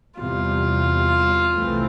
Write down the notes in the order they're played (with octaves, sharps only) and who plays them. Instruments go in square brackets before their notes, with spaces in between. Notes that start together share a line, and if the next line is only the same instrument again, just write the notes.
[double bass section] E2 C3 G3 [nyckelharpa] F4
[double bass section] C2 C3 E3 A3 C4